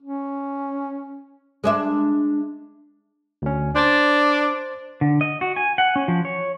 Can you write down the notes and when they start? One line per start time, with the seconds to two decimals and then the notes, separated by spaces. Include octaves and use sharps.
0.02 C#4
1.64 G#3 D4 E5
3.42 D2 C#4
3.76 D4 C5 A6
5.01 D3
5.21 D#5
5.41 F#4
5.56 G#5
5.78 F#5
5.96 C#4
6.08 F3
6.25 C#5